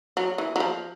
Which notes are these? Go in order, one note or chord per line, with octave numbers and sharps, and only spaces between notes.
F#3
E3
F#3
F3